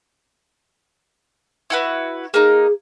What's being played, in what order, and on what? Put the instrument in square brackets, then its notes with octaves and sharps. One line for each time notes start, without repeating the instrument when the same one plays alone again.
[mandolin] E4 F#4 B4
[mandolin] A#3 D#4 [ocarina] G#4